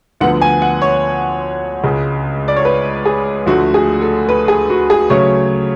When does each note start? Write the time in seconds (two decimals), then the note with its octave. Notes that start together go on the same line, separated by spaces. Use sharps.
0.21 D2 D3 F3 B3 F#5
0.42 G#5
0.62 F#5
0.82 C#5
1.83 C#2 C#3 G#3
2.48 D5
2.56 C#5
2.65 B4
3.06 G#4
3.46 D2 D3 F3 A3 F#4
3.74 G#4
4.01 A4
4.29 B4
4.48 G#4
4.70 F#4
4.90 G#4
5.10 C#3 F#3 A3 C#4 C#5